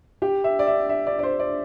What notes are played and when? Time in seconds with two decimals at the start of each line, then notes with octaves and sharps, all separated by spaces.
0.22 G4
0.44 E5
0.59 D5
0.67 E5
0.89 E5
1.07 D5
1.19 D5
1.23 C5
1.40 D5